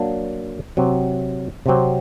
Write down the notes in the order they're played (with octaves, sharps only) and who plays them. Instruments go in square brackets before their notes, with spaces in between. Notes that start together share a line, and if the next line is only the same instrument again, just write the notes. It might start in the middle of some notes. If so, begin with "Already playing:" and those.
Already playing: [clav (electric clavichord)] F#3 A#3 D4
C3 F#3 C4
C3 F#3 C4